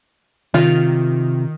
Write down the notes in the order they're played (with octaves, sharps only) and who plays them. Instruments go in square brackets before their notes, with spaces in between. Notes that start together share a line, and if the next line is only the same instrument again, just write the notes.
[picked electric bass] C3 [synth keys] D#3 [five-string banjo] F4